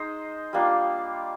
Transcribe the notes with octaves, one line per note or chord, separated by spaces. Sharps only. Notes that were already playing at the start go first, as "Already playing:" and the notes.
Already playing: G#3 D#4 C5 D#5
G3 A#3 D4 F4